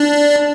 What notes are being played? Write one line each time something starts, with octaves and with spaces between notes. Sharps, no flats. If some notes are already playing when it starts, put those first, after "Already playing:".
Already playing: D4